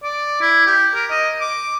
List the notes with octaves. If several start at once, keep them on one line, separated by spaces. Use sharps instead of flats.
D5
E4
G4
A#4
D#5
D6